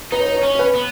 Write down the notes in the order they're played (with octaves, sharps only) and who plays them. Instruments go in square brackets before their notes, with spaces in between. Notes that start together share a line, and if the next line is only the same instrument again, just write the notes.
[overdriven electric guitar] D#4 [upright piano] B4
[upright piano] C#5
B4
C#5
[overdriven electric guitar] C#4
[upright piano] C#5
B4
[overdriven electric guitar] B3